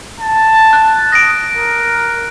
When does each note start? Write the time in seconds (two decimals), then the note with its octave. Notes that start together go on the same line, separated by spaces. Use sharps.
0.20 A5
0.73 F#6
1.13 D#6 A#6 D7
1.55 A#4